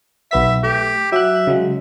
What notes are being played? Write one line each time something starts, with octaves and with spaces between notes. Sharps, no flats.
B1 B3 E5 B6
A3 G4
F#3 E5 F#6
C#3 F#3 G#3